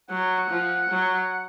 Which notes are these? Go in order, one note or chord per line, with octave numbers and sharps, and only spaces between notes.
F#3 F#5
F3
F#3